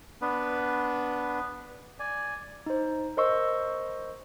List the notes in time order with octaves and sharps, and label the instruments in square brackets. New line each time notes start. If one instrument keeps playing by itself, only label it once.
[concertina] B3 D4 B4
D5 G#5
[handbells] D#4 C5
A#4 C5 D#5 C6 C#6 E6